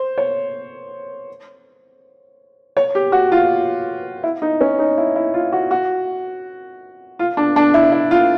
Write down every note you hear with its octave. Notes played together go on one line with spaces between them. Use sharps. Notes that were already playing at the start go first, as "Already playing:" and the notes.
Already playing: C5
C#5
C#5
G4
F#4
F4
E4
D#4
C#4
D#4
E4
E4
F4
F#4
F#4
F4
D4
D4
E4
E4
F4